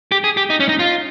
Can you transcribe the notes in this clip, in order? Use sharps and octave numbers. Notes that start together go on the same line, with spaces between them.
G4
G#4
G4
D#4
C#4
D#4
F4